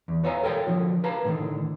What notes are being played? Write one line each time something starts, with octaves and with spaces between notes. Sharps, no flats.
E2
B4 C#5 E5 F5 G#5 A#5
A4 A#4 C#5 F5 G5
D3 F3 F#4
A#4 B4 F5 A5 A#5
A2 D3 D#3